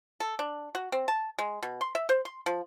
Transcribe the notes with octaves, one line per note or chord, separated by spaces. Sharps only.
A4
D4
F#4
C4
A5
G#3
B2
C6
E5
C5
C6
F3